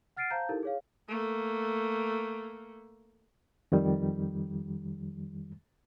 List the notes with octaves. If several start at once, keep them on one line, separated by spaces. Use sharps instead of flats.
F#5 F6 A6 C7 D7 D#7
C5 F5 A5 A#5 G6
D#4 E4 G4 A4 A#4
G#4 C#5 F5
A3 A#3
F2 D#3 G3